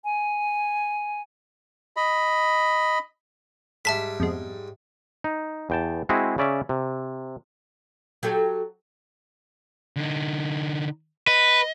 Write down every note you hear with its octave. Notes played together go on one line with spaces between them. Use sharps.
G#5
D#5 B5
G#2 G3 E5 A5 B6
F2 B2 G#3
D#4
E2 G5 A5
G#3 C4 E4 F#4 G#4
C#3 C#4 D5 E5
C3
F#3 G4 A4
D3 D#4
B4 D#5